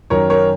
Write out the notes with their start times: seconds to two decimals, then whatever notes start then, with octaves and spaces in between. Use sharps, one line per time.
0.10 F#2 D#3 A#4 C#5
0.30 A#4 C#5